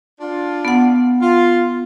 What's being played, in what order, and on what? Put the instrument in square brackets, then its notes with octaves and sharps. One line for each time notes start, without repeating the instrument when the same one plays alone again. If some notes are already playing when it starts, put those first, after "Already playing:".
[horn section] D4 F4
[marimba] B3 F#5
[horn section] F4